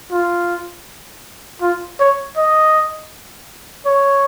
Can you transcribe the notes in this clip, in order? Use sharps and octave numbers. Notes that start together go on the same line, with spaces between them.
F4
F4
C#5
D#5
C#5